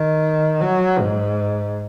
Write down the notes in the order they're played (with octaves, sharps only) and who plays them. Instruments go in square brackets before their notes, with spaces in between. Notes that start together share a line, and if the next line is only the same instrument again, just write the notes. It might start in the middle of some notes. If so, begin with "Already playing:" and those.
Already playing: [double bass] D#3
F#3
G#2